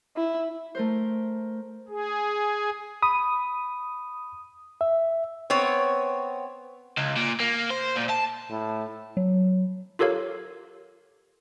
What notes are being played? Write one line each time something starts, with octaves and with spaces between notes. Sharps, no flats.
E4
A3 A#4 C5
G#4
B5 D#6
E5
B3 C4 C#5
C#2
A#2
A#3
C5
A#2
A5
A2
F#3
F4 G4 A4 A#4 C#5 F5